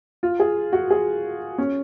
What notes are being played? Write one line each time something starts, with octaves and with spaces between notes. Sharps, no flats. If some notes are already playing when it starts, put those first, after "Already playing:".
F4
G#4
F#4
G#4
C#4